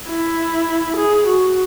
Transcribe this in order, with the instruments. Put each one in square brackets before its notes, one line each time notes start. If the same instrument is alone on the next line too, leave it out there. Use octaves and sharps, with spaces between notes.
[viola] E4
G#4
F#4